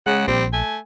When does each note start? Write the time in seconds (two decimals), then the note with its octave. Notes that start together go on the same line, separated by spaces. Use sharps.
0.07 C#3 G#3 F#5
0.28 A#1 G3 C4
0.53 A3 G#5